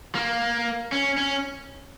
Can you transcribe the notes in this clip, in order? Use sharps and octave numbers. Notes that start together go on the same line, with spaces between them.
A#3
C#4
C#4